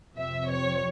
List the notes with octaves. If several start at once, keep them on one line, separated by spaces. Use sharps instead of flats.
F2 C3 F3 C4 E5
C#5